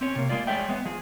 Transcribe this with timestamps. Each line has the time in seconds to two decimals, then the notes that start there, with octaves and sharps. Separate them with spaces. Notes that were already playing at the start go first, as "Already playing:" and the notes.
0.01 C4 C#4 C#5
0.16 C3 A#3
0.29 G#3 A#3 F4 D5
0.47 G#3 G#4 C#5 D5 E5 G5
0.68 G#3 B3
0.85 F3 G#4